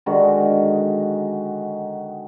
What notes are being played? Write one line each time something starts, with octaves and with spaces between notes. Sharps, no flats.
D3 D#3 G#3 F#4